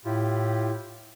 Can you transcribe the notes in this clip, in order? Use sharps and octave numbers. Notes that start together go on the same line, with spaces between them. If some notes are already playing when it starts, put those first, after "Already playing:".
A2 E4 F4 G4